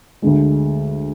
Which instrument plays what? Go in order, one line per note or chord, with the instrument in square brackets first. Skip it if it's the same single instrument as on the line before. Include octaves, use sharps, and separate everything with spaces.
[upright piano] D2 D3 G#3